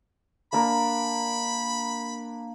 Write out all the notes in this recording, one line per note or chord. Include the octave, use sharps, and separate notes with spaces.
A#3 D4 A#4 B5